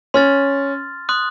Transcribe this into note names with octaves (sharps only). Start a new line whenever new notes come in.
C#4 C6 F6 A6
C6 D#6 F#6